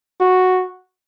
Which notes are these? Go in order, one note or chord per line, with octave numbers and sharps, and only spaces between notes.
F#4